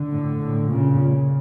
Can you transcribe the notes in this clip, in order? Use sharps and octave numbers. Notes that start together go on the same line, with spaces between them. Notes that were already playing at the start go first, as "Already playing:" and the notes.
Already playing: D3
A2
A2
A#2 C#3
A#2